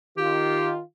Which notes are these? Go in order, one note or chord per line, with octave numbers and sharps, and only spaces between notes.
D#3 F4 G4